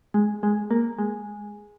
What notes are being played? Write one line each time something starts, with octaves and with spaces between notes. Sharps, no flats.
G#3
G#3
A#3
G#3